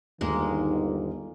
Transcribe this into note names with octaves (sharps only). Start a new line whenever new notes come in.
G1 D#2 D#3 G#3 A#3